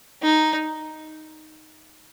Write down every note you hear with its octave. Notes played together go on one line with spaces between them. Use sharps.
D#4